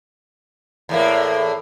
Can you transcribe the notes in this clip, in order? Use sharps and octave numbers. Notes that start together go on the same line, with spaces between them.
E2 A2 A#3